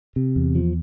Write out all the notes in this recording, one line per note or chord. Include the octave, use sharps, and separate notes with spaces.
C3
E2
F3